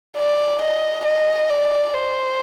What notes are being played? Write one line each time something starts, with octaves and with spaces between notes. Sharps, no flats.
D5
D#5
D#5
D5
C5